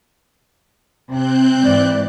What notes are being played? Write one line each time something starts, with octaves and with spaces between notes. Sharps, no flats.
C3 C4 F#6 G6
G#2 E3 D5